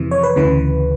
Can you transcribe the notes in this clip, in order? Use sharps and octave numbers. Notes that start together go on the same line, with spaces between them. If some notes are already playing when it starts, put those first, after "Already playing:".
Already playing: F2 C3 E3
C#5
B4
D2 C#3 E3